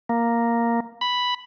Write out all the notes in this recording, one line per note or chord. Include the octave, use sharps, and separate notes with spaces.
A#3
B5